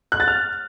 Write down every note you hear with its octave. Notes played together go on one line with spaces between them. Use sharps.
F#6
A6
F6